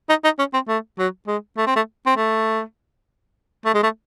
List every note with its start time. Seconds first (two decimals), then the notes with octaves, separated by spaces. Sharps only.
0.09 D#4
0.24 D#4
0.39 C#4
0.54 C4
0.68 A3
0.98 F#3
1.27 G#3
1.57 A3
1.67 C4
1.76 A3
2.06 C4
2.17 A3
3.65 A3
3.74 G#3
3.83 A3